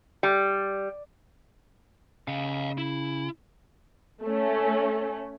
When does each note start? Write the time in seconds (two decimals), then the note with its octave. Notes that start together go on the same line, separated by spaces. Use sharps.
0.23 G3
2.28 C#3 D#5 F5
2.78 E4
4.24 A3 C#4